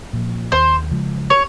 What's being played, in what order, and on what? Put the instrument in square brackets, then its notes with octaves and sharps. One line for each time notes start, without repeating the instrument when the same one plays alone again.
[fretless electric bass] A#2 F3
[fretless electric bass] D#2 [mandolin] C5
[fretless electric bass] C#3 F3 G#3
[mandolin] C#5